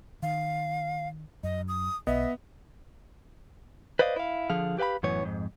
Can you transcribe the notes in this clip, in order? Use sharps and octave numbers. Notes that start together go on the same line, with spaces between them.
D#3 F5
F#2 D#5
D#6
B1 B3 D#5 E5
B4 C5 D5 D#5 F5
E4 F5
D3 F3 G#4 F5
G4 B4 F5 G5 B5
F#2 A2 E3 B3 C#5
F2 G#2